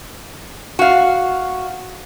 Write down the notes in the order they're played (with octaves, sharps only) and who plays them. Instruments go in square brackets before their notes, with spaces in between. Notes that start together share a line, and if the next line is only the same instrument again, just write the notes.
[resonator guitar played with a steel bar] F#4 F5